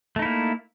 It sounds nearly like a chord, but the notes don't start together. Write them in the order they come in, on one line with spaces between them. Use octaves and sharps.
A3 D#4 E4 A#3